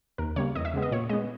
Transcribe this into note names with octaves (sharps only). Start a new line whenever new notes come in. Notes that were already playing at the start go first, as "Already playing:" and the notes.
D#2 A#4
C#3 G3 A#3 C#5
E2 D#5
E5
C#3 G#3 B3
D#5
A#2 C#5
G#3 B3 D#5